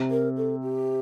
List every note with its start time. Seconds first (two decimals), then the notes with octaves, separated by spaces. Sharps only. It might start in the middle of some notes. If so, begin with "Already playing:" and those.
Already playing: C3
0.10 A#4
0.37 A4
0.62 G4